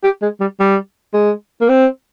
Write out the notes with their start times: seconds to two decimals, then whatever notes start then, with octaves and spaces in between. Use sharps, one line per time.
0.04 G4
0.22 G#3
0.40 G3
0.60 G3
1.14 G#3
1.61 A#3
1.69 C4